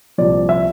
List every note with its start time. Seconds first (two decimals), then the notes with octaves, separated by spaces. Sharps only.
0.18 C2 A#2 F3 D5
0.49 E5